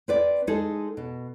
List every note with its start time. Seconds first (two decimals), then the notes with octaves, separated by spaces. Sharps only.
0.08 C4 B4 D5
0.47 G#3 D#4 G#4 A4
0.97 B2